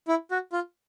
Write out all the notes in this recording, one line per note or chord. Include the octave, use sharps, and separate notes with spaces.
E4
F#4
F4